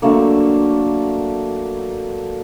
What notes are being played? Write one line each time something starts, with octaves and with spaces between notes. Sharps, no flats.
D3 F#3 A3 A#3